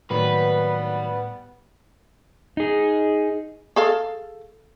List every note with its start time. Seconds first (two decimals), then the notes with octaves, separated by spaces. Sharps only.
0.11 A2 D#3 F#3 G3 A#3 B3 B4
2.57 D#4 G#4
3.76 G#4 A4 F5